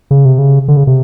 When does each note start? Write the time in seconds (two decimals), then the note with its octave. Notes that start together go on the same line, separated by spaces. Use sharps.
0.11 C#3
0.25 C3
0.38 C#3
0.68 D3
0.77 C#3
0.87 C3